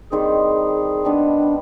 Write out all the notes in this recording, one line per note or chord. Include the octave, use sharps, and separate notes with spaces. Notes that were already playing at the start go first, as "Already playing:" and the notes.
D#3 G3 C4 D#4 G#4
D#3 G3 B3 D4